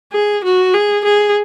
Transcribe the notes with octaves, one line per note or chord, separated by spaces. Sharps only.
G#4
F#4
G#4
G#4